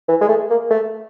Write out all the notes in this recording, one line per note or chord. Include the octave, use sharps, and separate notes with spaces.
E3
G#3
A3
A#3
A3